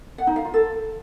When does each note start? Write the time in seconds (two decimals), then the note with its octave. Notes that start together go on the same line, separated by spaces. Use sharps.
0.18 F#5
0.27 D#4
0.36 F5
0.45 F4
0.54 A4